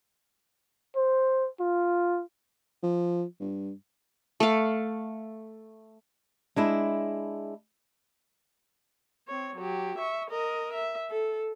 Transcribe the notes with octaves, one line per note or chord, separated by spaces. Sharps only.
C5
F4
F3
G2
A3 F5
G#3 D4 E4
C4 C#5
F#3 G4
E5 C#6
A#4 D#5
E5
A4